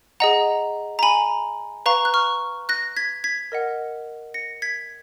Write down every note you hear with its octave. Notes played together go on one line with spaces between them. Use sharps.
G#4 D#5 F#5 A#5
A#5
G#5 B5
B4 F5 A#5 C#6
F#6
C#6 F6
F#6 A#6
G#6 B6
G#6 B6
A#4 D#5 F#5
A#6 C#7
G#6 B6